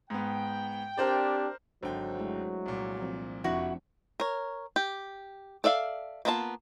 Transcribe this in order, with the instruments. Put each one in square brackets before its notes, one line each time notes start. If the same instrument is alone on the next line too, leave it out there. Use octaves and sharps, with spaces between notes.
[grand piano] G#2 B3 [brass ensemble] G5
[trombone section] C4 D4 G4 [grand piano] A#4 C5 D5
[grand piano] G#1 D3 G5 [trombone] F#3 [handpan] D4 C5
[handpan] G#3 A3 E4
[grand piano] C2 A#2
[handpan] F3 C4
[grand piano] F1 [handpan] F3 C4 D4 [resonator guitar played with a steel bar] E4 F#4
[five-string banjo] A#4 C#5
G4
A4 D5 E5 F5
A#3 B3 F4 D#5 A5